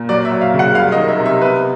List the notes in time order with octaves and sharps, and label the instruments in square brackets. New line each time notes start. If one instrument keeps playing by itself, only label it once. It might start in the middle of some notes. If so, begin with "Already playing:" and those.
Already playing: [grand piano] A#2
F#3 D5
E5
F#3
F5
C#3
F#5
C2 F5
D#5
D#3
E5
C3
E5
B3 B4